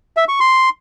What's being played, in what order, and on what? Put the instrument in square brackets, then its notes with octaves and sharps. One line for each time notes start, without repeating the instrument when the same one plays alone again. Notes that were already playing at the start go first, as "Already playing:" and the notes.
[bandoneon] E5
C#6
C6